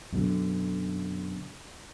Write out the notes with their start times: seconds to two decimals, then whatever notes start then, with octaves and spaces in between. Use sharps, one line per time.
0.12 F#2 B2 D3